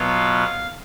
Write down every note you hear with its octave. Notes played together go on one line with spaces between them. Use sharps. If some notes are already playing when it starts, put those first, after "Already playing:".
Already playing: B2 F#3 B3 F4 F5